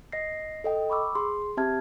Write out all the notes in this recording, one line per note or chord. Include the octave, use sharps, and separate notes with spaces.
D#5 A#6 C7
A4 D#5 G5
B5 C#6 D6 E6
G#4 C6
C4 G4 E5 A5 F6 G#6